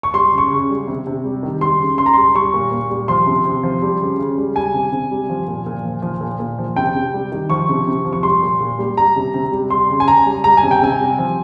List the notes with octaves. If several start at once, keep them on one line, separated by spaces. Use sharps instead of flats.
C#6
G3 C6
C#3
C#6
C#3
G3
C3
C3
G3
D#3
G3 C6
C#3
C#3 C6
A#5
G3 C6
G3 C#6
A#2
A#2
G3
F3 C6
C3
C3
F3
G3
C#3
C#3
G3
G3 G#5
C3
C3
G3
F3
A#2
A#2
F3
F3
A#2
A#2
F3
C3 G5
C3
G3
D#3
F3 C#6
C3
C3
F3
C#6
G3 C6
A#2
A#2
G3
G3 A#5
C3
C3
G3
G3 C6
C#3
G#5
C#3 A#5
G3
G3 A#5
G#5
C3
G5
C3 G#5
G3
F3